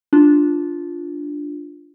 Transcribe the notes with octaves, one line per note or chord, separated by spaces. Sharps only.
D4 F4